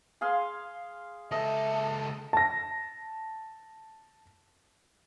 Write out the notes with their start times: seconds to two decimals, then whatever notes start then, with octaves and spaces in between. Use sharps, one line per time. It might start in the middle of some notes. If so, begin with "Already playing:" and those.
0.21 G#4 F5 C6
1.31 C#2 A4 D#5 E5
2.33 A5 A#6